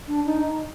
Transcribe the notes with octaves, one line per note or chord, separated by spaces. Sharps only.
D4
D#4